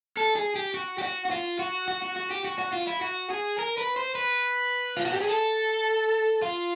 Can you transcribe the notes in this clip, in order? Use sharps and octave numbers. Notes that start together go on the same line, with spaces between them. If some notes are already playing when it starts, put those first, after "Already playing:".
A4
G#4
G4
F#4
G4
F#4
F#4
F4
F#4
F#4
F#4
F#4
G4
F#4
F#4
F4
E4
F#4
G#4
A#4
B4
C5
B4
F4
F#4
G4
G#4
A4
F4